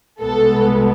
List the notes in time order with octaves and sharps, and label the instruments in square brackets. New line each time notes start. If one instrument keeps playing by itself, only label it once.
[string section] C2 B2 G#3 B3 A4